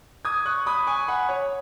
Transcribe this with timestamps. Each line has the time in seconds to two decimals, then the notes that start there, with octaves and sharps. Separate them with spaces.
0.25 D#6 G#6
0.46 C#6 F#6
0.66 B5 D#6
0.87 G#5 C#6
1.08 F#5 B5
1.29 C#5